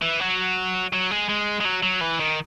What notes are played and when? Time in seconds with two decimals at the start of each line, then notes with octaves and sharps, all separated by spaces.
0.02 E3
0.20 F#3
0.93 F#3
1.11 G#3
1.29 G#3
1.61 G#3
1.65 F#3
1.83 F#3
2.01 E3
2.19 D#3